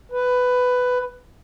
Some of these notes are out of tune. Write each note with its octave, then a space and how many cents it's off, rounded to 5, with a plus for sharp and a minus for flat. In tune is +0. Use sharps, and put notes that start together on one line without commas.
B4 +10